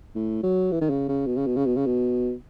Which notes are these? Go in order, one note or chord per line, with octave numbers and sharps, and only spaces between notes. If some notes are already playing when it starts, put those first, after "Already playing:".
A2
F#3
E3
D#3
C#3
C#3
B2
C#3
B2
C#3
B2
C#3
B2